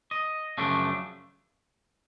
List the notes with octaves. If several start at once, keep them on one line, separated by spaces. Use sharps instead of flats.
D#5
F#2 C#3 F3 A3 D4